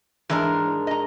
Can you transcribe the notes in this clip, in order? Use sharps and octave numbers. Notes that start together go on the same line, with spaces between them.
G#2 E3 D4 A#4
D#5 A#5